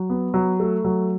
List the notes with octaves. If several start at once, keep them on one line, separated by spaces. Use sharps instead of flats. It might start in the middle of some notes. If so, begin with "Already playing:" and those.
Already playing: F#3
B3
F#3
A3
F#3